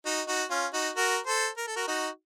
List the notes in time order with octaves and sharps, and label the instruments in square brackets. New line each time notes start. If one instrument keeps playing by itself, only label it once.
[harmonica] D#4 F#4
D#4 F#4
C#4 F4
D#4 F#4
F#4 A#4
A4 C5
A#4
A4
F#4 A#4
D#4 F#4